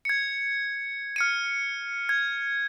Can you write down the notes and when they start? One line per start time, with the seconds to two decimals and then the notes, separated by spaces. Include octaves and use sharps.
0.05 G#6 C#7
1.16 F6 C#7 D#7
2.09 G#6